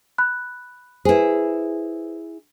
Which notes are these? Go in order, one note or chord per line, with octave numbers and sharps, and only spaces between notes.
B5 F#6
E4 G#4 B4 C5